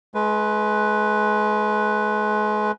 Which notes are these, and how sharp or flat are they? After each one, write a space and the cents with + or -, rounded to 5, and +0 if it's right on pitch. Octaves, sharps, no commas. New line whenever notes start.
G#3 +35 B4 +0